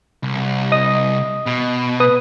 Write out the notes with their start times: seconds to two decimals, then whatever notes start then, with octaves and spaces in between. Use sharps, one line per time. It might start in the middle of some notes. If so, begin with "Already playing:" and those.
0.23 C2
0.72 D#5 D#6
1.46 B2
2.00 B4 D#6